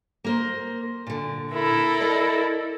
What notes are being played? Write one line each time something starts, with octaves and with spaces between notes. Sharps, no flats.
A#3 A#4 C5
A#2 D3
E4 A4 A#4
D5 D#5